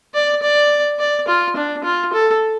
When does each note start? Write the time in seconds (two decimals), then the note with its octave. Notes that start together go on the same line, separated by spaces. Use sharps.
0.14 D5
0.42 D5
1.00 D5
1.28 F4
1.56 D4
1.84 F4
2.13 A4